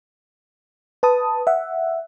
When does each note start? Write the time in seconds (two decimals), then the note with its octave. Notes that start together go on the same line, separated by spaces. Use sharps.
1.03 B4 A5 D#6
1.47 E5 F#5